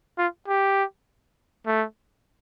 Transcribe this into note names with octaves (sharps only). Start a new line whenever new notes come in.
F4
G4
A3